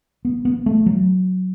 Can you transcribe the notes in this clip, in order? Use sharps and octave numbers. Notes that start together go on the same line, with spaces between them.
B3
B3
A3
F#3